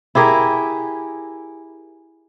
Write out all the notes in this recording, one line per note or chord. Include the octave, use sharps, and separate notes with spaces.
E4 G4 G#4 A#4